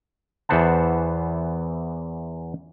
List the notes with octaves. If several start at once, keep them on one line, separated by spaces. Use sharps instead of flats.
E2 E3 B3 C5 F#5 A5